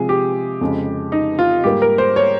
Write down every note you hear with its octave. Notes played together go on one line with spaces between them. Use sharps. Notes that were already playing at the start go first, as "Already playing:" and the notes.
Already playing: C3 F3 G#3 G#4
G4
F2 C#3 G#3
D#4
F4
G#2 G3 A#3 G4
A#4
C5
C#5